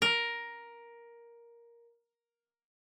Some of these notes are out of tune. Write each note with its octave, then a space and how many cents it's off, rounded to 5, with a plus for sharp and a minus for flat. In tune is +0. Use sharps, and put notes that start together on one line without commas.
A#4 +10